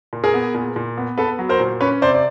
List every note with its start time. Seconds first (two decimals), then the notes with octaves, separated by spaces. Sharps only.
0.13 A#2
0.24 G#4 A#4
0.34 B3
0.55 A#2
0.76 A#2
0.98 B3
1.18 B3 A4 B4
1.39 F#3
1.49 A#4 C5
1.60 A#2
1.81 C#4 B4 C#5
2.02 C3 C5 D5
2.14 D5